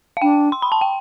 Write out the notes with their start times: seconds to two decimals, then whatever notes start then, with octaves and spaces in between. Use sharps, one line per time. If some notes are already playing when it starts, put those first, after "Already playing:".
0.17 F5
0.22 D4 G5
0.52 C6
0.62 B5
0.72 A5
0.81 G5